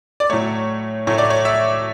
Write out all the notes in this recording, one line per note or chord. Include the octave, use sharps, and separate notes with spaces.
D5
A2 F#3 A3 C#5
A2 F#3 A3 C#5
D5
C#5
E5